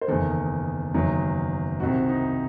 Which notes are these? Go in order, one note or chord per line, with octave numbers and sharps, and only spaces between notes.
C5
F#1 E2 D#3 A4
F#1 E2 D#3 F#3
C2 C3 D#3 F#4
D#4